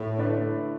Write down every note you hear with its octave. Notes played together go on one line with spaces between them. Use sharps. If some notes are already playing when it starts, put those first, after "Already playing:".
Already playing: A2
D3 A3 E4 B4 D5